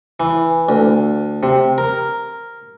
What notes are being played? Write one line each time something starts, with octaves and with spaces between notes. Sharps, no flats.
E3
D2
C3
A#4